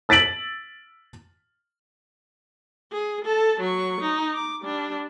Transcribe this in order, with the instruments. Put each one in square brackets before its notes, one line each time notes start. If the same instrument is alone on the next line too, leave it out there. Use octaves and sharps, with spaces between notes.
[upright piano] E6 A6 B6 D7 F#7
[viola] G#4
A4 A5
F#3 C#6
D#4
D6
G3 D4